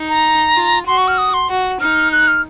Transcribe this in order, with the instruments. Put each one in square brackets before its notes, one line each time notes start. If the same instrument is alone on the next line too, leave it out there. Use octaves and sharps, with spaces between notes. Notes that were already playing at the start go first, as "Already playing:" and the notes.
Already playing: [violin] D#4
[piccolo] A#5
[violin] F4
[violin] F#4 [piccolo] C6
[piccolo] C#6
F6
D#6
C6
[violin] F#4
[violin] D#4 [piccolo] F6
[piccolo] F#6
F6